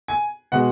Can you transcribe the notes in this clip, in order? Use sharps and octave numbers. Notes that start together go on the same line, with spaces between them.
G#5
B2 G#3 F#5